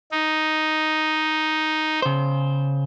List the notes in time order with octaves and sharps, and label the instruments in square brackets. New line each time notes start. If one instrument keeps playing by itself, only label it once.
[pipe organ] D#4
[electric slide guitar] C#3 C5